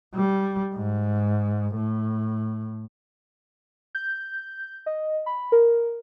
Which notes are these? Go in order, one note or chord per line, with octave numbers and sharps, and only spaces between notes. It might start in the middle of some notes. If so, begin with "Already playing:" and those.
G3
G#2
A2
G6
D#5
B5
A#4